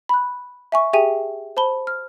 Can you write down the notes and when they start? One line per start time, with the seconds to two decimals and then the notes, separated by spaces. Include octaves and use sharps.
0.09 B5 F#6
0.72 E5 G#5 C#6
0.93 G4 G#4 E5 G5 G#5 D#7
1.57 C5 A5 B5 G7
1.87 F6